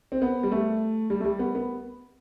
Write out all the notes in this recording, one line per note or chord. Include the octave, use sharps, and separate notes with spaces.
C4
B3
G3
A3
G3
A3
G3
B3
B3